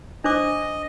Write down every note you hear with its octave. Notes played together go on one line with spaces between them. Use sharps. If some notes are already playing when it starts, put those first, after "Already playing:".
D4 C5 D#5 D6